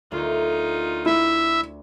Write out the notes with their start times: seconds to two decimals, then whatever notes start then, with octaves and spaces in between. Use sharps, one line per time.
0.12 D2 D#4 F4 A#4
1.06 E4 E5